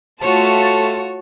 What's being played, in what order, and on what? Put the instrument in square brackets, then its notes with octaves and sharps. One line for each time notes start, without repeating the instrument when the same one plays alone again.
[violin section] A3 F4 A5 [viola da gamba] F#4 C#5